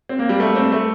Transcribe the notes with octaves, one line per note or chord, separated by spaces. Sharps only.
C4
A#3
G3
A3
C4
A3